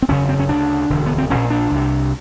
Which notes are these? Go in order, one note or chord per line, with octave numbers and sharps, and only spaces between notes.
C4
F#1 E2 C#3 C#4
C4
C#4
D2 C#3 D4
E1 D2 D3
B3
C4
A#1 A#2 C#4
D4
C2 C3